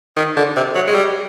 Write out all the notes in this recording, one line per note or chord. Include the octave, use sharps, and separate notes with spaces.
D#3
D3
C3
F#3
G#3
G3